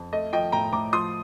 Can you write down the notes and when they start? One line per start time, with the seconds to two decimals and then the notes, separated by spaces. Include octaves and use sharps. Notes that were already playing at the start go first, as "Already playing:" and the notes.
Already playing: F2
0.13 A3 D#5
0.33 F3 D#5 G5
0.52 A2 G5 A#5
0.73 A2 A#5 D6
0.93 F3 C6 D#6